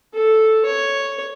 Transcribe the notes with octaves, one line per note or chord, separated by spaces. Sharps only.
A4
C#5